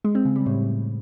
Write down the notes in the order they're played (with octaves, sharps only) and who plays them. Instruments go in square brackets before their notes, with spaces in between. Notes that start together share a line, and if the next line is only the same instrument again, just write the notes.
[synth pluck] G#3
C4
C#3
G3
A2